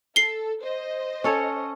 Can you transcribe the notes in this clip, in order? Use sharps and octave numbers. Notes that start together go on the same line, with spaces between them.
A4 C7 G7
C5 D#5
C#4 A4 C#5